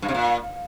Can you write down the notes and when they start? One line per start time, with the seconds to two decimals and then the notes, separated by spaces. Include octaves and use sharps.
0.02 G2
0.08 C3
0.14 A#2